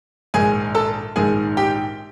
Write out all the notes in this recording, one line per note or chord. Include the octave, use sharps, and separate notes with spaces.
A#1 G#2 D#3 G#4 G#5
A4 A5
A#1 G#2 D#3 G#4 G#5
G4 G5